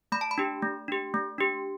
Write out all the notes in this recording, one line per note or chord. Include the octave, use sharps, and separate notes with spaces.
A3 B5
A5
B5
D4 G4
A3
D4 G4
A3
D4 G4